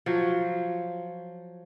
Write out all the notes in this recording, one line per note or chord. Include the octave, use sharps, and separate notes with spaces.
F3 F#3